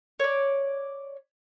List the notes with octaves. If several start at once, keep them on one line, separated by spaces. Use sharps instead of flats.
C#5 D5